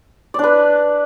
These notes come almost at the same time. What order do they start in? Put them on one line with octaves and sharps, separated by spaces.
D5 D4 B4